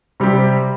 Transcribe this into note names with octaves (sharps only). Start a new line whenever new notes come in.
C3 G3 C4 G4